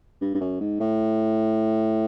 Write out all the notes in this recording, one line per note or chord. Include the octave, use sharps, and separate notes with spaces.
G2
G2
F#2
G#2
A2